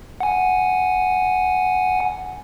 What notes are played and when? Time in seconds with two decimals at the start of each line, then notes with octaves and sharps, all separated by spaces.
0.20 F#5 G#5